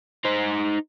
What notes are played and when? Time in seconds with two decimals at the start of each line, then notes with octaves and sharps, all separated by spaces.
0.25 D#4 C5